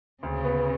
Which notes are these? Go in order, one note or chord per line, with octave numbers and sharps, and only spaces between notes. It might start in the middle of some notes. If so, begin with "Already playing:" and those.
D2 C#3
B3